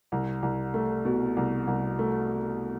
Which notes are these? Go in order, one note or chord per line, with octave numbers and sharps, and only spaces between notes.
C2
C2
A3
B2
C2
C2
A3